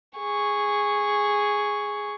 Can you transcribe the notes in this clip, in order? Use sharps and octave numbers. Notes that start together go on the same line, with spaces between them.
G#4 C#6